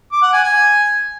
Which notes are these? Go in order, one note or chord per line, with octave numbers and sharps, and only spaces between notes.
D6
F#5
G#5
G#5